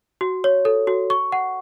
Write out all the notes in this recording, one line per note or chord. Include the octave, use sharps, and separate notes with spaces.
F#4
C#5
A4
F#4
C#6
F#5